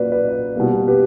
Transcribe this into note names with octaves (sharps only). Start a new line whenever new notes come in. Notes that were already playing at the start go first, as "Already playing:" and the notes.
Already playing: A#2 F#3 A#3 B4 D5
B4 D5
B2 G3 A#3
G4 B4